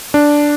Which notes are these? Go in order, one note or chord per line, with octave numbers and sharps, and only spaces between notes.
D4